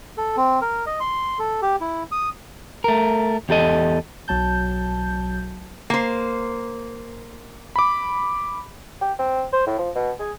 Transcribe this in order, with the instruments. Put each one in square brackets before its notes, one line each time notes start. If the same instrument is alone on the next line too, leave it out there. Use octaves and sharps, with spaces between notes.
[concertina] A4
C4
A#4
D#5
C6
A4
G4
E4
D#6
[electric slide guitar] A3 A#4
E2 G4 A4 D#5
[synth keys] B1 F#3 A5 G6
[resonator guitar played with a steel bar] A#3 C5
[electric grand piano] B5 D6
[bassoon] G4
C4
C5
A2
F3
B2
G#4